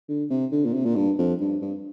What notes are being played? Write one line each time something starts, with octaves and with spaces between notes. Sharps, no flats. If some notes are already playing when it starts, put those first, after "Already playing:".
D3
C3
D3
A#2
C3
A#2
G2
F2
G2
G2